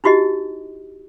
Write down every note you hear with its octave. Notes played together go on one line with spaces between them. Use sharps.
D#4 E4 F#4 G4 D#5